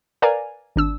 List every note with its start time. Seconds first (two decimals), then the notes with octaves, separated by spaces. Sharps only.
0.22 A#4 B4 D5 F5 G#5 A#5
0.76 G#1 D4 E6